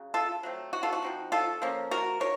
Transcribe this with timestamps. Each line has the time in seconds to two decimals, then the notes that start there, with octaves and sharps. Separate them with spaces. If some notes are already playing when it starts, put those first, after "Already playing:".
Already playing: C#3 F#3
0.14 F4 A4
0.43 F#3 A3 C4
0.73 F#4
0.83 F4 A4
0.93 F#4
1.03 F3 C4 D#4
1.32 F4 A4
1.62 F3 A#3 C#4
1.91 F#4 A#4
2.20 D#4 A#4 C#5